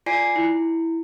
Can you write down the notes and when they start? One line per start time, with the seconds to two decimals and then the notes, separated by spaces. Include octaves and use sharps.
0.06 F4 D5 G#5 C7
0.36 E4